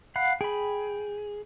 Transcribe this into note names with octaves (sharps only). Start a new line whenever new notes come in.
F5 F#5 B5
G#4 G5 B5